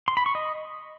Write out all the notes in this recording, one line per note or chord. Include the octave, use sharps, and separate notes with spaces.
C6
B5
C#6
D#5